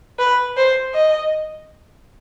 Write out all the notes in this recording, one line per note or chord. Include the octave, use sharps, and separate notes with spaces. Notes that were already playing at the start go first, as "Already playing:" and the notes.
B4
C5
D#5